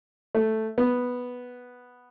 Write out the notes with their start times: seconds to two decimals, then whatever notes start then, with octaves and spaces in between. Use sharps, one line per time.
0.35 A3
0.78 B3